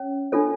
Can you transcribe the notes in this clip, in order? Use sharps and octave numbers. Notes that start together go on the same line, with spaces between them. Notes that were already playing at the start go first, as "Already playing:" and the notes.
Already playing: C#4 C#5
D4 F4 A4 C#5